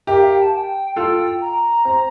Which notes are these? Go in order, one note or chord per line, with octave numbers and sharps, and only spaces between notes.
G4 A#4 E5
F5
G5
A5
A5
G5
F4 A4 G5
A#5
C4